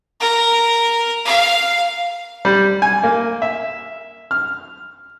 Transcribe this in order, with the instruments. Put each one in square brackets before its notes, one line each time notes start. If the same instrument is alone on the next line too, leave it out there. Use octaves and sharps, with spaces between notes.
[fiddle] A#4
F5
[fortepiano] G3
G#5
A#3
E5
F6